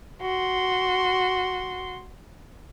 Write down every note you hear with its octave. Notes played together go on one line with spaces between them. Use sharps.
F#4 C6